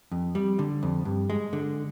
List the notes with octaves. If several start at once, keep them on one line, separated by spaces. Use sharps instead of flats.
F2
G3
D3
F2
G2
G#3
D3